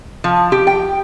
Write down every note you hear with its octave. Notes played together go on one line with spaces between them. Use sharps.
F3
G4
G5